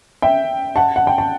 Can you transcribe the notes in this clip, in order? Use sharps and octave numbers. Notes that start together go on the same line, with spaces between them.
E5 G5
F#5 A5
F#5
G5
A5